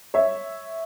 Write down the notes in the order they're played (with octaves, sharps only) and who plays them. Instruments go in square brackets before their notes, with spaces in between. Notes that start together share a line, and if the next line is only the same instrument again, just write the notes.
[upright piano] C#5 E5